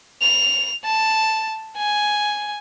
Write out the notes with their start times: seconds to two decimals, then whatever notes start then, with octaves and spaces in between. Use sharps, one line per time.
0.22 F7
0.85 A5
1.78 G#5